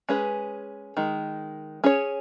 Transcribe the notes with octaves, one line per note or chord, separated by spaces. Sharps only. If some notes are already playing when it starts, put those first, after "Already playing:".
G#3 C#4 G#4 B4
D#3 G#3
C#4 G#4 C#5